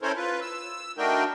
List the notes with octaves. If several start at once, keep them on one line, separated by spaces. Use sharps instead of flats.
C#4 E4 A4 A#4 C5 C#5
F4 B4
E6
A3 D4 D#4 F#4 A#4 G5